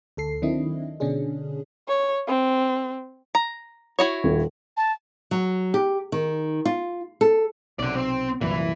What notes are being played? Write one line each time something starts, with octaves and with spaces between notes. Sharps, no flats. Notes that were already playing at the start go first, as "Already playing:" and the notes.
D2 A4 C7
D#3 F#3 C4 D4 E4 D#5
B2 D3 C#4 D4 G#4
C#5
C4
A#5
E4 F#4 C#5
D#1
A5
F#3
G4
D#3
F4
A4
B1 C3 D5 F#5
C4
C2 F#2 A#2 E3